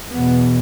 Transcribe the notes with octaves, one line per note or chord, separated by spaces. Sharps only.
E2 B2 B3